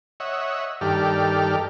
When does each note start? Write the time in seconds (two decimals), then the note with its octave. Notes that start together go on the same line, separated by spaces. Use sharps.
0.20 C#5 D#5 E5 F#5
0.81 G2 D#3 G4 A4 D5 F6